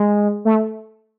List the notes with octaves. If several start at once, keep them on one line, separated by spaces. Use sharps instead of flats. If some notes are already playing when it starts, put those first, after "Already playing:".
Already playing: G#3
A3